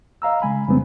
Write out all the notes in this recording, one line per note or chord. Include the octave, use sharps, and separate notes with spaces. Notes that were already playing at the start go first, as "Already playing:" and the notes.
D#5 F5 A#5 E6
C#3 G#3 G#5 B5
F2 C#3 G3 G#3 B3 C4